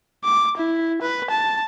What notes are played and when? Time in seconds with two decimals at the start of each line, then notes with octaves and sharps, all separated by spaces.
0.24 D6
0.57 E4
1.02 B4
1.31 A5